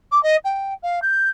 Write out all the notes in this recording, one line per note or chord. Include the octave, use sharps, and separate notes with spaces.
D6
D#5
G5
F5
G6